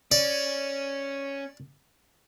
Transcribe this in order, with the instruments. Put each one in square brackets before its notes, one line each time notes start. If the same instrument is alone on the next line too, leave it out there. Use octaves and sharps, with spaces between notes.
[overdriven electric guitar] C#4 [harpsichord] D5